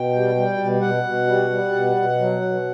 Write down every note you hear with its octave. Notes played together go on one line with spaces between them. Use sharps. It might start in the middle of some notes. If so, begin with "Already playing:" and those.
Already playing: B2 G5
G3
G3
B2
B2 F#5
B2
G3
G3
B2
B2
F#3
B2